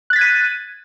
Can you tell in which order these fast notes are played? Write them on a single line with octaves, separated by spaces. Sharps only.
F#6 A6 B6 G#6 D#7